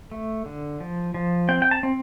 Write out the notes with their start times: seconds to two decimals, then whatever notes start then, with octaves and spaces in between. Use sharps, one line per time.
0.11 A3
0.46 D3
0.80 F3
1.14 F3
1.49 C4 G5
1.62 G5
1.71 A5
1.83 C4